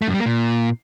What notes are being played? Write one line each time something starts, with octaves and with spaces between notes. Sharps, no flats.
A3
F#2
G3
A#3
A#2